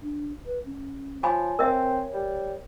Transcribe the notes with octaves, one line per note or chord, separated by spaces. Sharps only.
D4
B4
C#4
F3 C#5 G#5 B5
C4 A#4 E5
G3